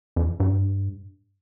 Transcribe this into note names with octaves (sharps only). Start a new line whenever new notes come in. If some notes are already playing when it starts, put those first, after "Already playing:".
F2
G2